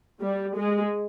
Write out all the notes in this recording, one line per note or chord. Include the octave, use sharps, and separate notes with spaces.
G3
G#3